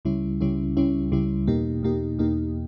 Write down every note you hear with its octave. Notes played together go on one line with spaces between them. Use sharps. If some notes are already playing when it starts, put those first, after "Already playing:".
C#2 C#3 G3 C#4 E4
C#2 C#3 G3 C#4 E4
C#2 C#3 G3 C#4 E4
C#2 C#3 G3 C#4 E4
E2 B2 A#3 D#4 G4
E2 B2 A#3 D#4 G4
E2 B2 A#3 D#4 G4